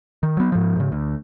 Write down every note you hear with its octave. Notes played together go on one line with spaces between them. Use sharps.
D#3
F#3 B3
G#2 F3
G#2 C#3
D2